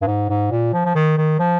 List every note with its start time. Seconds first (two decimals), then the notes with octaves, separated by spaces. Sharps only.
0.02 G2
0.07 G#2
0.30 G#2
0.51 A#2
0.73 F3
0.85 F3
0.95 D#3
1.17 D#3
1.39 F3